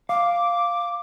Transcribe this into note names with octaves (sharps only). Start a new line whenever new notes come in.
F5 D6